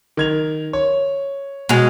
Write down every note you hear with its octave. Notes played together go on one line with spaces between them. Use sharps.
D#3 G#6 F7
C#5
B2 G#3